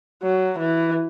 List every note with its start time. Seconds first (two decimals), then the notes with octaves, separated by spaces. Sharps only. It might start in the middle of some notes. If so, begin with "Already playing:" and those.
0.22 F#3
0.59 E3